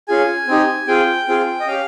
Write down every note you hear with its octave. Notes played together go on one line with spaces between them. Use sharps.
C#4 F4 G#4 G#5
C4 D#4 G4
C4 F4 G#4 G5
C4 F4 G#4
D#5
C#4 G4 F5